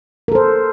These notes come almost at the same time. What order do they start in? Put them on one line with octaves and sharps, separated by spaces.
A#4 A4 C5